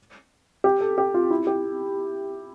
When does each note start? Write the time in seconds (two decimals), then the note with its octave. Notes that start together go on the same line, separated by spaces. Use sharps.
0.64 G4
0.81 A4
0.98 G4
1.14 F4
1.31 E4
1.47 G4